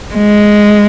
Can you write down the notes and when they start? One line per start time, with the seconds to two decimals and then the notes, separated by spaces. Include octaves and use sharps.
0.14 G#3